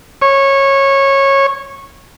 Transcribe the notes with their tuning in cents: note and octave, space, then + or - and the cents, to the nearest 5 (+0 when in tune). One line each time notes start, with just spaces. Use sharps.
C#5 -15